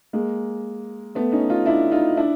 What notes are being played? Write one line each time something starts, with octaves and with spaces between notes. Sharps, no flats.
G#3 A#3
A3 B3
C#4 D#4
D#4 F4
D4 E4
D#4 F4
D4 E4